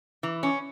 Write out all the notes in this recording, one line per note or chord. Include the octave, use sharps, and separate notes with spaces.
E3
C#4